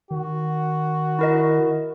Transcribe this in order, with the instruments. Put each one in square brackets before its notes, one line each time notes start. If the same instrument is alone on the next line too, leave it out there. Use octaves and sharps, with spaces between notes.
[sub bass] D#3 [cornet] F#4
[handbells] E4 A#4 D#5